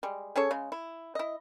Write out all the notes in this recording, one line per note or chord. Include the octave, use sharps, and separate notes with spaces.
G3 G#3
C#4 G#4 A4 C#5
C#3 G#3
E4
E4 D#5